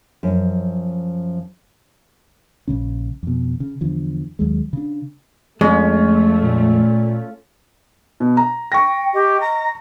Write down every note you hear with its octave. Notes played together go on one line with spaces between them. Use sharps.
F#2 F3
A#1 D#2 C#3 C#4
F2 B2
C#3
E2 D3 F3
D#2 F#3 G#3
C#3 D4
F2 G#3 A3 C#4 F4
A#2
B2
A#5
G5 C#6 A#6
G4 D#5
A#5